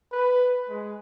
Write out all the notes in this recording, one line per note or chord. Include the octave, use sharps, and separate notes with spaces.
B4
G#3